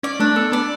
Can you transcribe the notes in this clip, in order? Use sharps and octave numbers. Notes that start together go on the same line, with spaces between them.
C#4 D5
A3 D4
B3 A4
B3 D5